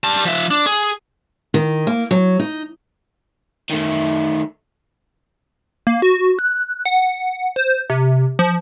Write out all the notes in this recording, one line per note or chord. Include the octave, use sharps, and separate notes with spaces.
G3 A5
F3 E5
D4
G#4
D#3
A#3
F#3
D#4
D#3 A3
A#3
F#4
F#6
F#5
C5
C3
F3